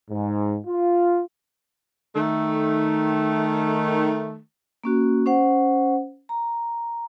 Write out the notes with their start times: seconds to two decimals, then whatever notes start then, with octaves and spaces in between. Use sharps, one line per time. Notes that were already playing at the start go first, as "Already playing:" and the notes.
0.10 G#2
0.67 F4
2.15 D#3 A3
4.84 A#3 C#4 F#4
5.26 C#4 C5 F#5
6.29 A#5